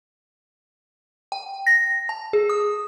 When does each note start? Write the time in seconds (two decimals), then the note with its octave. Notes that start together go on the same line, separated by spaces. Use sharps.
1.32 G5
1.67 A#6
2.09 A5
2.33 G#4
2.49 D#6